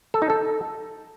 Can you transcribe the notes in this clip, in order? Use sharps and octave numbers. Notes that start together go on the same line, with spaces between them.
A4
D#4
A4